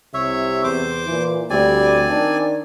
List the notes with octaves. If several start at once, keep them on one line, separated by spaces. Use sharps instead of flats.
C2 C3 C#5 E5
E2 C5 D6
A#2 E3
D2 G3 C4 D5 G#5
D#3 D4